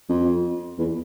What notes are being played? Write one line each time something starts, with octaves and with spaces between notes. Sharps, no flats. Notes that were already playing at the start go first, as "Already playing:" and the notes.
F2
E2